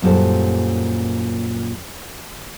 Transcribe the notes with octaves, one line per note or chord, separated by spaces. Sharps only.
F#2 A#2 G3 D#4 A4 C5